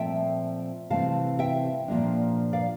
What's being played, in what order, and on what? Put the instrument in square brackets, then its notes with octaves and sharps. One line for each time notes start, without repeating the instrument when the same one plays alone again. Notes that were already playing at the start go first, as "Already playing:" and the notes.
Already playing: [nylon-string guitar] A#2 F3 A3 C4 E5 G5
C3 E3 A3 C4 F5 A5
E5 G5
A#2 F3 A#3 D4
D5 F5